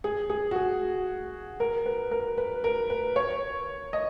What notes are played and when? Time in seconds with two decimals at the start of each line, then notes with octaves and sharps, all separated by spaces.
0.04 G#4
0.30 G#4
0.51 F#4
0.56 G#4
1.60 A#4
1.86 B4
2.11 A#4
2.38 B4
2.64 A#4
2.90 B4
3.16 C#5
3.93 D#5